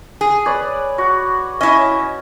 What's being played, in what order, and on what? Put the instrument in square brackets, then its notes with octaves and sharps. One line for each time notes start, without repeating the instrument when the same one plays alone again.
[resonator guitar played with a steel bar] G#4
[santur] B4 C#5 D5
F#4
[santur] C#4 [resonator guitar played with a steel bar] E4 D#5